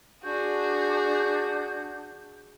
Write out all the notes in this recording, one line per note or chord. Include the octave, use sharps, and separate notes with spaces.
D4 F#4 G#4 G6